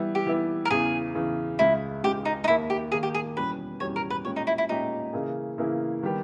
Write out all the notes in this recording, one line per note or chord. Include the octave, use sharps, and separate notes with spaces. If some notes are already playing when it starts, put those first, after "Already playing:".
Already playing: E3 G3 B3 E4
G4
E3 G3 B3 E4
A#4
E2 C#3 E3 G#4
E2 C#3 E3
C#2 C#3 G#3 E4
C#2 C#3 G#3 G4
D#4
D#4
D#2 D#3 A#3 E4
G4
D#2 D#3 A#3 G#4
G4
G#4
E2 B2 G3 C#4 G4 B4
E2 B2 G3 C#4 G4 C#5
A#4
B4
A#2 G#3 C#4 G4 C#5
D#4
E4
E4
A#2 G#3 C#4 D#4 G4
C#3 E3 A#3 E4 G#4
C#3 E3 A#3 E4 G#4
D#3 G3 B3 G4